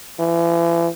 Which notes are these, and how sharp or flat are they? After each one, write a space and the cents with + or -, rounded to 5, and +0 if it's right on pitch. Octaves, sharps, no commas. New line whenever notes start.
E3 +40